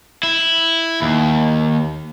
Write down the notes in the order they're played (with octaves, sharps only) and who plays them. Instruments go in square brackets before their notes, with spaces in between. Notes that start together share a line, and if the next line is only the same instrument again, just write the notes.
[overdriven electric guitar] E4
D#2